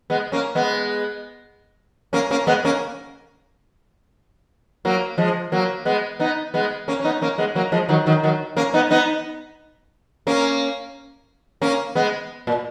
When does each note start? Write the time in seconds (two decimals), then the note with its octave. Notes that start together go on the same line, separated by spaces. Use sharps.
0.10 G#3 B3
0.32 A#3 C#4
0.55 G#3 B3
2.13 A#3 C#4
2.31 A#3 C#4
2.47 G#3 B3
2.65 A#3 C#4
4.85 F#3 A#3
5.18 F3 G#3
5.52 F#3 A#3
5.85 G#3 B3
6.19 B3 D#4
6.54 G#3 B3
6.88 A#3 C#4
7.00 C#4
7.04 B3 D#4
7.22 A#3 C#4
7.38 G#3 B3
7.55 F#3 A#3
7.72 F3 G#3
7.89 D#3 F#3
8.06 D#3 F#3
8.23 D#3 F#3
8.57 A#3 C#4
8.74 B3 D#4
8.91 B3 D#4
10.27 A#3 C#4
11.62 A#3 C#4
11.95 G#3 B3
12.47 A#2